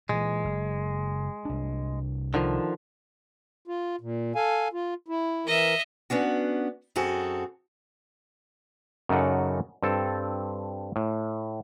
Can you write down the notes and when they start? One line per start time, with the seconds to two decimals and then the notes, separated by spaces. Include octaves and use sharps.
0.09 A#2 E3 G#3
0.45 F#1
1.45 C2 D4
2.34 D3 D#3 F3
3.68 F4
4.01 A#2
4.35 A4 F5 G#5
4.73 F4
5.08 E4
5.47 E3 A#4 D#5 E5
6.10 B3 C#4 D4 F#4
6.96 F#2 C4 F#4 G#4 A4
9.09 F#2 C#3 D#4 A4 D5 F#5
9.83 G2 C4 A4
10.96 A2